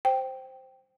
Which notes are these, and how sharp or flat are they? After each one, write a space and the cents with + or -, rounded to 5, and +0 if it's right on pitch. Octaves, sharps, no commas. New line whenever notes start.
C5 +0 G5 +0